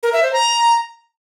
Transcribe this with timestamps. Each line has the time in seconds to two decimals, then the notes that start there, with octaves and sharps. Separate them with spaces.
0.03 A#4
0.13 E5
0.23 C5
0.33 A#5